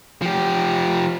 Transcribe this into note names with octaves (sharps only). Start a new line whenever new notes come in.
F3 G4